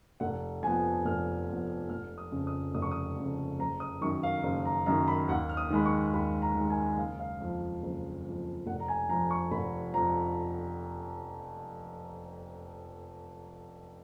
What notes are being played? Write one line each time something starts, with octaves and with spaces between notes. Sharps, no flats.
F1 F#5
F2 F3 B3 G#5
F1 F6
F2 F3 B3
F1 F6
D#6
F2 C#3
D#6
F1 D#6
C#6
D#6
F2 C#3
F#1 A#5
D#6
F#2 D#3 C#6
F5
F#1
A#5
F#2 D#3 A#5
B5
D#2 F#5
F6
D#6
D#3 G#3 B5
C#6
D#2 B5
A#5
D#3 G#3
G#5
F#1 F5
F5
F2 F3
F#1
F2 F3
F1 F#5
A#5
G#5
F2 F3 A#5
C#6
F1 B5
F2 F3 A#5